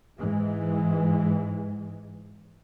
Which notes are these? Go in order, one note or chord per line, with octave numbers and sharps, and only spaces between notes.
G#2 E3 G#3